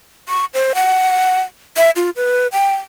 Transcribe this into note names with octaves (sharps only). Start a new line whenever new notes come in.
C#6
C5
F#5
E5
F4
B4
G5